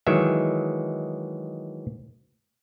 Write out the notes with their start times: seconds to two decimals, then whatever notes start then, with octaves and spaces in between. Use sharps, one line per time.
0.07 D#3 E3 F#3 G#3 E5